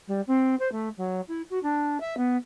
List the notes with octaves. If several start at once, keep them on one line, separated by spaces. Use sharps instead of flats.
G3
C4
C5
A3
F#3
E4
F#4
D4
E5
B3